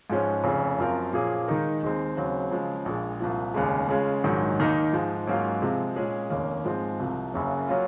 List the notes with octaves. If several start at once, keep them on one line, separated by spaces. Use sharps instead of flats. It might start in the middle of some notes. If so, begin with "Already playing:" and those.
G#2 F3 G#3 C#4
F1 F2 C#3
F#2 F3 C4 F4 A#4
A#2 F3 A#3 C#4 G#4
D#3 G#3 D#4 A#4
D#2 D#3 G#3 C4
D#2 C#3 F#3 C4
C#3 F3 G#3
A#1 A#2 G#3
C2 A#2 F3
F1 D#2 C#3 G#3
C#3 G#3 C#4 F4
A#1 G#2 D#3 F#3
D#2 D#3 A#3 D#4
G#2 F3 G#3
G#2 F#3 A#3 C#4 F4
C3 F3 G#3
A#2 G#3 C#4 G#4
F1 D#2 D#3 A#3 C#4
G#2 F3 G#3 C4
C2 C3 F3
F#1 F#2 C#3 F#3 A#3
F#3 A#3 C#4 F4